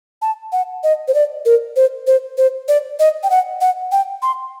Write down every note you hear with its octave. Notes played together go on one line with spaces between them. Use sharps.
A5
F#5
D#5
C5
D5
A#4
C5
C5
C5
D5
D#5
G5
F#5
F#5
G5
C6